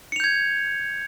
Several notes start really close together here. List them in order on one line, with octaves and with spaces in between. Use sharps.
C#7 F7 G6 G#6